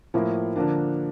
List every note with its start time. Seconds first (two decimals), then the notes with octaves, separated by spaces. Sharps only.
0.14 A2 F3 A#3 E4
0.56 D3 F3 A#3 D4